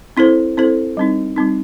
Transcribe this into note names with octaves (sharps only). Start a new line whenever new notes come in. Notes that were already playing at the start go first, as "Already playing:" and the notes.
C4 E4 A4 C5
C4 E4 A4 C5
G3 C4 D#4
G3 C4 D#4